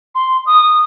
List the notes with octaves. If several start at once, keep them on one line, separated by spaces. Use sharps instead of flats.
C6
D#6